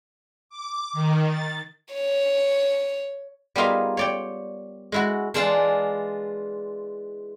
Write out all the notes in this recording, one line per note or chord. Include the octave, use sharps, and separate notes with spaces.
D6
D#3
A6
C#5
G3 B3 D#4 F4 G#4 A#4
C#5 D5 G5
G#3 E4 F#4
E3 G#3 D4 F4 G5 A5